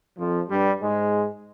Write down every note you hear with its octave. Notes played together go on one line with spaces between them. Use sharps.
F2 F3
G2 G3
G#2 G#3